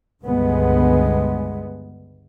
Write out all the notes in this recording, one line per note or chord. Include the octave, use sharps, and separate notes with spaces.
C#2 G2 D3 G#3 B3